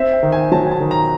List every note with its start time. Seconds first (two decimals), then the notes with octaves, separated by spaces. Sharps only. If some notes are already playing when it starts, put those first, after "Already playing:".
Already playing: C4 E5
0.12 G5
0.23 D#3
0.32 G#5
0.52 F#3 A5
0.67 G#5
0.71 A5
0.80 D#3
0.91 A#5